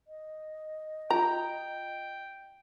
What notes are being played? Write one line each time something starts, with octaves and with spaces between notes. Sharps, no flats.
D#5
F4 G5 A#5